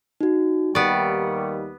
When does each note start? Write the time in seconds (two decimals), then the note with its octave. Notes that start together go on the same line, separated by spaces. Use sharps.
0.21 D#4 F#4
0.75 D#2 D#3 G3 B3 D5 C#6 C#7